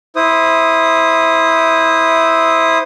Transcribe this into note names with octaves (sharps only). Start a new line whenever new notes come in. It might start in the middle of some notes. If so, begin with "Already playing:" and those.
E4 C5 D#6